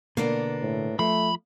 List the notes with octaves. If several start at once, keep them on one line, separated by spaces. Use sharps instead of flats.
B2 D3 A#3 B3 D4
A2
F3 A3 B5